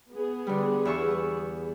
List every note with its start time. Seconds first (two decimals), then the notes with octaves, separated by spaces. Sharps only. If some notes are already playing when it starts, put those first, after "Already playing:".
0.13 B3 G#4
0.47 D3 G3
0.85 E2 E5 C#6